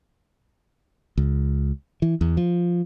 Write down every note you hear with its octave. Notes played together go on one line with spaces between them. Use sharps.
C#2
E3
E2
F3